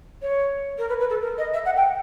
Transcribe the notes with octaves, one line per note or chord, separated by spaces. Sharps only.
C#5
A#4
B4
B4
A4
A#4
D#5
E5
F#5
G5